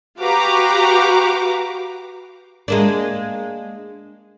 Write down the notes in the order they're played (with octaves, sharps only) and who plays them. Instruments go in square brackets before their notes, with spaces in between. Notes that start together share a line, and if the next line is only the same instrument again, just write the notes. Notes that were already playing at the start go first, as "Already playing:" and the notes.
[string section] F#4 G4 B4 F5 A#5 D6
[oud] G#3 A#3 D4